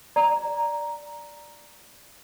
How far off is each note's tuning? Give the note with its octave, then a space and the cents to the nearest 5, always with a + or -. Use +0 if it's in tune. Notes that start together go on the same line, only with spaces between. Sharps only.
D5 +0 A#5 +0